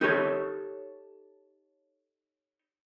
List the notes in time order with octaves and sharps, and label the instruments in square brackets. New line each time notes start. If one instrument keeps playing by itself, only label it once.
[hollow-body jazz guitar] D#4 G4 A4 C#5